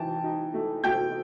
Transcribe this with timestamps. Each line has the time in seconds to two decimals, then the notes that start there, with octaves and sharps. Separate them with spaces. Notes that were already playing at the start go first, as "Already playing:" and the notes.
Already playing: E3 D#4 G5 A5
0.24 D#4
0.54 A3
0.84 A3 G5 G6